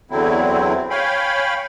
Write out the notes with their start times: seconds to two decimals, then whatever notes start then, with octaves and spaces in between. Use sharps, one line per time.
0.11 E2 D3 F#3 C4 E4
0.90 C#5 F5 G5 G#5 B5